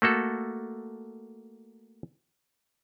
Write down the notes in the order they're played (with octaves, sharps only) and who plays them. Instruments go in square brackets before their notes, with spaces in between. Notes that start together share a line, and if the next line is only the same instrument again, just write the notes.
[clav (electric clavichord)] A3 A#3 F#4 A4